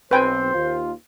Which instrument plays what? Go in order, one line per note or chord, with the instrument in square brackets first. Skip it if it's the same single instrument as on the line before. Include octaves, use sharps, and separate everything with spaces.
[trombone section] B1 C4 [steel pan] B4 G5 G#5 [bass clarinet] C5
[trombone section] D#2 F4